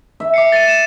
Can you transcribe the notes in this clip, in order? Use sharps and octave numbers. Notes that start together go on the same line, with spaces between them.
E5
D6 C7 C#7
A6 D#7
E7